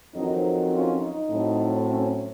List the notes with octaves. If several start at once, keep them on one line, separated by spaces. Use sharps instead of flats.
F2 D#3 F#3 C4 D#4
C#4 F4
D#4
A2 F#3 C4
C#4